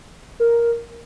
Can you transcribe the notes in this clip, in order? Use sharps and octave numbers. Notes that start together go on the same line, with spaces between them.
A#4